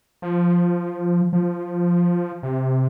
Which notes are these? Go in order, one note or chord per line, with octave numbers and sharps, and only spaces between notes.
F3
F3
C3